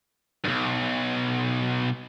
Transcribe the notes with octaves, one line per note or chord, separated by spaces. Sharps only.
B1 G2